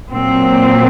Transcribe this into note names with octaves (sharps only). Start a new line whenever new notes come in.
A#2 F#3 C4